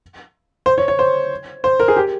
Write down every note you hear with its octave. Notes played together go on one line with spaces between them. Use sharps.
C5
C#5
C#5
C5
C5
A#4
G#4
G4